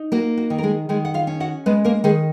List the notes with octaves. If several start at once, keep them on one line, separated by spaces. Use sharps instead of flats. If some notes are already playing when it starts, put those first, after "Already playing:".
Already playing: D#4
A#3 F#4
F#4
D#3
A#4
G#3 G#4
D#3 G#3 G#4
F#5
F4 F5
C#4
F#4 F#5
G#3 B3 B4
A#3 A#4
D#3 G#3 G#4